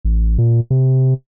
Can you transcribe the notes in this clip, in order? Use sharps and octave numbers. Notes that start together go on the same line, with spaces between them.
A1
A#2
C3